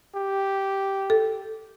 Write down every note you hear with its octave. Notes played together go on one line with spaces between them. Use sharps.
G4
A4